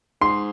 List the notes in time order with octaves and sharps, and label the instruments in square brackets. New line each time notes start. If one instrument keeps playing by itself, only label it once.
[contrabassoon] G#2 [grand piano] C6